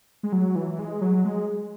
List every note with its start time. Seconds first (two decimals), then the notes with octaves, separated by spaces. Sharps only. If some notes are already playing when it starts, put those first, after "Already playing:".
0.23 G#3
0.32 F#3
0.56 E3
0.79 G#3
1.01 F#3
1.25 G#3